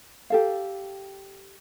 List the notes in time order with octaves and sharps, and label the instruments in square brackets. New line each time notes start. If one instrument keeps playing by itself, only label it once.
[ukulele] G4 A4 F5